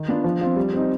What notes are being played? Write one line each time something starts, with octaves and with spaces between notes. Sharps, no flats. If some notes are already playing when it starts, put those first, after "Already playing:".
Already playing: D#3
B3 D4 F4
F3
C4 F4
G3
C4 D#4